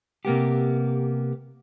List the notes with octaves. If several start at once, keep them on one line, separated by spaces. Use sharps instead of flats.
C3 A#3 B3 G4